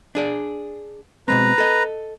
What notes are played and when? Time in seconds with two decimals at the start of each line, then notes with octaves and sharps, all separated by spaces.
0.15 D4 G#4 D5
1.28 B2 G#3 C4 B4 A#5
1.58 A4 D#5